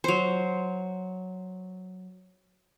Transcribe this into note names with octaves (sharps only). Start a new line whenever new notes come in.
F#3 C5